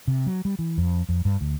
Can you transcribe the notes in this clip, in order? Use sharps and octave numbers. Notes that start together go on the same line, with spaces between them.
C3
F#3
G3
E3
F2
F2
G2
D2